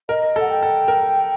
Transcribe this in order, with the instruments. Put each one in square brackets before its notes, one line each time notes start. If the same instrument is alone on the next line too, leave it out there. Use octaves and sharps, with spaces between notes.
[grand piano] A#4 [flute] D#5
[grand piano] A4 [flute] F#5
[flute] G5
[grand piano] A4
A#4